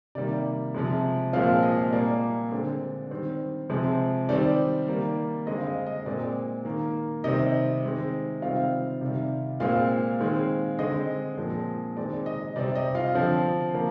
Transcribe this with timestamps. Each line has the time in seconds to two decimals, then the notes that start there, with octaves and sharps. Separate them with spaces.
0.15 C3 D#3 G3 A#3 D5
0.74 C3 F3 G#3
1.33 A#2 F3 G#3 C4 F4 F5
1.63 D#5
1.92 A#2 G3 A#3 D5
2.52 D3 G#3 C4
3.11 D#3 G3 C4
3.70 C3 F3 G#3 C4
4.29 D#3 G3 C4 D5
4.88 D#3 G3 A#3
5.47 D3 G#3 C4 D#5
5.58 F5
5.67 D#5
5.86 D#5
6.06 A#2 G#3 C4 D5
6.65 D#3 A#3
7.24 C3 D#3 G3 C4 D#5
7.83 D#3 G#3 C4
8.42 C3 D#3 G3 C4 F4 F5
9.01 C3 D#3 G3
9.60 A#2 G#3 C4 F4 F5
10.20 D#3 G#3 C4
10.79 D3 G#3 C4 D#5
11.38 A#2 F3 G#3 C4
11.97 D#3 G#3 C4 D5
12.26 D#5
12.56 C3 G3 C4 D5
12.75 D#5
12.95 F4 F5
13.15 D3 F3 C4
13.74 F3 A#3